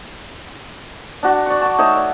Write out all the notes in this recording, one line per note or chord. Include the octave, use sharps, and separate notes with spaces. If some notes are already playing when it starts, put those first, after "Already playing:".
D4 F#4
D5 C#6
A5 D6
A3 D#4 C#5 E6
D5